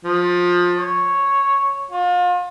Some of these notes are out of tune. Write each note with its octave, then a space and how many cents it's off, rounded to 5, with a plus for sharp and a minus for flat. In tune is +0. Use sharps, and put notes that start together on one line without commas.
F3 +20
C#5 -5
F4 +35